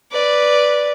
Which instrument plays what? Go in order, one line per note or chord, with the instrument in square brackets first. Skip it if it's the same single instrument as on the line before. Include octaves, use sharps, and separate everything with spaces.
[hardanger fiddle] B4 D5